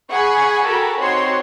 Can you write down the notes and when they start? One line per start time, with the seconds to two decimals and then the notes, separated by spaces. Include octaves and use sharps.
0.13 G#4 F#5 G#5 B5 C#6
0.66 F#4 G4 A4 A#4 B5
0.99 C4 D#4 F#4 C#5 F#5 C6